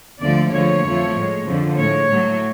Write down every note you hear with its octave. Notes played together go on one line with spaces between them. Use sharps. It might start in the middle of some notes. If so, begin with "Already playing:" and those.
D2 D3 F3 A3 D5
D2 D3 F3 G#3 C#5
F2 F3 A3
A2 G#3
F2 D3 F3
A2 G#3 C#5
A2 F#3 A3